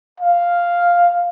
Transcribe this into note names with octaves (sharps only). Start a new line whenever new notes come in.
F5